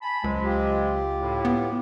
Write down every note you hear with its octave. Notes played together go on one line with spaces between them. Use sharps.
G#5 A5 B5
C#2 F3 F#3 G#3
F4 G4
A2
B3